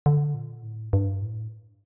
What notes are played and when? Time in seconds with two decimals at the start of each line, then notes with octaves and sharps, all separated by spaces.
0.06 D3
0.34 A#2
0.63 A2
0.93 G2
1.22 A2